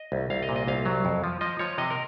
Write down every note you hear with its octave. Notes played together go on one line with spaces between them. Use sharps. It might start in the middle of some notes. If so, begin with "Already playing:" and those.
Already playing: D#5
C2
C2 F5
D#5
A#2
D#5
C2 F5
F#3
F2
F3
F3 D#5
F3 C#5
C3 D#5
A#4